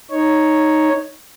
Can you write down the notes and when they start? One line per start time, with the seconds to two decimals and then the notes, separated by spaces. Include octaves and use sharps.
0.11 D#4 C#5